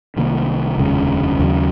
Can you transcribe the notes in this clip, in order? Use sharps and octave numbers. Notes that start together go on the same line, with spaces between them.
C2 C3 D#3 A#3
F1 D#2 C#3 G#3
D#2 C#3 F#3